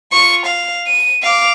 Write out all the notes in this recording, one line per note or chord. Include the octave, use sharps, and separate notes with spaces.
F4 C#6
F5
D#7
F5 D6